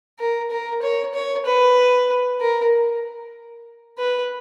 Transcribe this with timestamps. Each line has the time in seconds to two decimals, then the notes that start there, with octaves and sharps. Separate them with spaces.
0.19 A#4
0.51 A#4
0.82 C#5
1.14 C#5
1.46 B4
2.40 A#4
3.99 B4